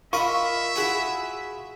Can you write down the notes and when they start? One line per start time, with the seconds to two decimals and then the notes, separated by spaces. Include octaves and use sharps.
0.13 F4 A#4 D#5 E5 B5 C#6
0.76 E4 F#4 G#4